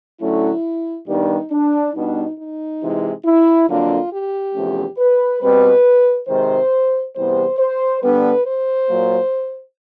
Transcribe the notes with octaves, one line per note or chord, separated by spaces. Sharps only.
D3 F#3 A3 C#4 E4
G2 D#3 G3 B3 D4 D#4
D4
B2 G3 B3 D4 D#4
D#4
C3 E3 G#3
E4
F2 D3 F#3 A#3 D4 F4
G4
E2 C3 F3 A3 C#4
B4
B2 G3 C4 B4
C3 D#3 G#3 C5
E2 C3 E3 G3 B3 C5
C5
D3 G3 B3 D4 B4
C5
A#2 F#3 A#3